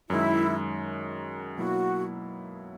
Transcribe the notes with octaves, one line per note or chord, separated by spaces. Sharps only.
F#2 D#3 G#3 E4
B2 F#3 A#3 E4 F#4